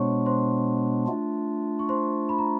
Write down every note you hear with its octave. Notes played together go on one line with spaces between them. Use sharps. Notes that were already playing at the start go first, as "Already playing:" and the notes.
Already playing: B2 G#3 B3 D4 C5 C#5 C6 C#6
C5 C6
A3 D4 F4
C#6
C5 C6
B5
A#5